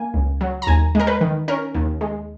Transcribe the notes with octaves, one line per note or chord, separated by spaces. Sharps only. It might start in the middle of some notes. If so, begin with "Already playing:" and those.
Already playing: A#3 G#5
C#2
F#3
A#5
D#2 G#5
G#3 A#4
B4
D#3
C#4 A#4
D#2
G#3